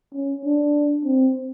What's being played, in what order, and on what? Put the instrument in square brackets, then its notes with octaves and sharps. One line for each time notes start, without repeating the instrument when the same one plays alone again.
[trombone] C#4
D4
C4